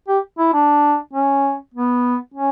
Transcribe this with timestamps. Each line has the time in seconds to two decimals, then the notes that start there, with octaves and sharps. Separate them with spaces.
0.08 G4
0.38 E4
0.54 D4
1.13 C#4
1.74 B3
2.34 C#4